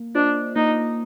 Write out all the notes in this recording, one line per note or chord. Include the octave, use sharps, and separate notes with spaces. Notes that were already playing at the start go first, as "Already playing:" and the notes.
Already playing: A#3
D4 F4 C5 D#5
A#3 D#4